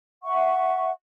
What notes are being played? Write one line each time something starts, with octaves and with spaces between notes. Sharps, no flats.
E5 F#5 C#6